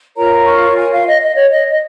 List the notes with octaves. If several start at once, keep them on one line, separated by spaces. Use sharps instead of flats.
F4 A#4 C#5 A#5
C#6
G#5
F5
D#5
D#5
C#5
D#5
D#5